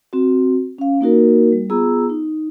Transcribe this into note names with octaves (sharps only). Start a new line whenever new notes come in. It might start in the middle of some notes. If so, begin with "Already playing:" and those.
C4 F#4
C#4 F5
A#3 D#4 F#4 A#4
G3
B3 F4 G#4 A#5 E6
D#4